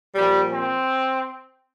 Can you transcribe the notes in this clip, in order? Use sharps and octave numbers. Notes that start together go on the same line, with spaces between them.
A#2 F3 G3
C4